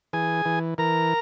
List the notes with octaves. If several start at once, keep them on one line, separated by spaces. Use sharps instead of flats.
E3 G#4 G#5
E3
E3 A#4 A#5